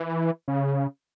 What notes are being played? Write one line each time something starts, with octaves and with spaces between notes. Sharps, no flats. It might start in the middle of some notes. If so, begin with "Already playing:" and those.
Already playing: E3
C#3